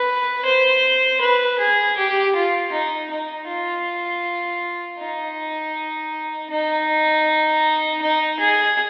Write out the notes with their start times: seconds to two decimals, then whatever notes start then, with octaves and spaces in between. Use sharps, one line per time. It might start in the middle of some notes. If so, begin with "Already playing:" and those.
Already playing: B4
0.45 C5
1.21 B4
1.59 G#4
1.97 G4
2.35 F4
2.72 D#4
3.11 D#4
3.48 F4
5.00 D#4
6.50 D#4
8.02 D#4
8.39 G#4